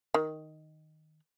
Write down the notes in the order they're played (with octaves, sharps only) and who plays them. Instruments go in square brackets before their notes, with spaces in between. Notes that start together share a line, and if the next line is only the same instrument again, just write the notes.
[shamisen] D#3